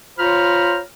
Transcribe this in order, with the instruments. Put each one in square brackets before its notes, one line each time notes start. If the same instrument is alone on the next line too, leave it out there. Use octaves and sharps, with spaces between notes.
[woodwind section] F4 C5 C#5 A#5 B5 F6